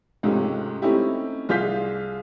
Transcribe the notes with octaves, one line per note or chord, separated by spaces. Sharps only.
C#2 G#2 C3 A3 C#4
A3 C4 C#4 D#4 E4 G4
C2 F4 G#4 G6 B6